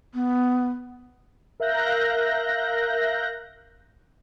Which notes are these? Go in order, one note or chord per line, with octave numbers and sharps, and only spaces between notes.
B3
A#4 E5 F5 F#6 G6 A#6